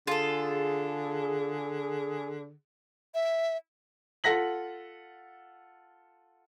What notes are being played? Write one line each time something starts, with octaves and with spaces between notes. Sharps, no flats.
D3 F4 G#4 A4
E5
F4 A4 F#5 A#6 B6 F#7